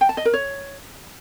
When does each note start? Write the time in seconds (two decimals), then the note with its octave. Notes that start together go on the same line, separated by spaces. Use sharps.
0.01 G5
0.09 A5
0.17 D#5
0.25 A#4
0.34 C#5